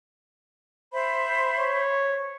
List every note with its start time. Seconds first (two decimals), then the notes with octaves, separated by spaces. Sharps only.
0.93 C5 E5 B5
1.59 C#5